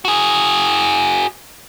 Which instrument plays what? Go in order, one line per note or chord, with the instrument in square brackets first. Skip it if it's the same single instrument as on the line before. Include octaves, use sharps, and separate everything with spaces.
[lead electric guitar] F#4 G#4